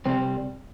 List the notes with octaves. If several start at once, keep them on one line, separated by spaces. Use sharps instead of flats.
C2 C3 G3 C4